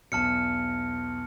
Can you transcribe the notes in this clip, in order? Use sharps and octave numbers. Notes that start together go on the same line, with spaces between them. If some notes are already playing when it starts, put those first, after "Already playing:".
B1 E2 A5 F6 C#7